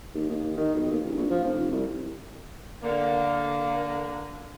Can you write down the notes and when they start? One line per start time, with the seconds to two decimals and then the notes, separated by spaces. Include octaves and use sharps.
0.14 D#2
0.29 D#2
0.43 D#2
0.57 D#3
0.74 B1
0.91 D#2
1.04 D1
1.17 A#1
1.30 F3
1.44 F1
1.59 F1
1.72 C2
2.82 D3 A#3